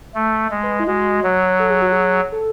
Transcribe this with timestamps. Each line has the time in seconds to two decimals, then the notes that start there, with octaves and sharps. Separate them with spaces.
0.15 A3
0.51 G#3
0.63 B4
0.80 E4
0.87 G#3 F#4
1.23 F#3
1.60 A4
1.70 G#4
1.82 F#4
1.92 G#4
2.32 A4